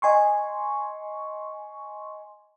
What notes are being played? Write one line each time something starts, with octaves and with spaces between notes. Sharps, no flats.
D#5 G#5 C6 C#6